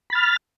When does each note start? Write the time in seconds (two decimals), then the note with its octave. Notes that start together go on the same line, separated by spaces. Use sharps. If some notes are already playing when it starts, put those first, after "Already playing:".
0.10 B5
0.13 A6
0.15 F6